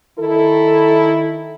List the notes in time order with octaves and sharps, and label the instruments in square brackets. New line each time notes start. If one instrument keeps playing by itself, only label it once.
[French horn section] D#3 E4 A4